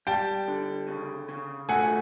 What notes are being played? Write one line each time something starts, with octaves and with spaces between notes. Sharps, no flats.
G3 G5 A5
D3
C#3
C#3
A3 F#5 G#5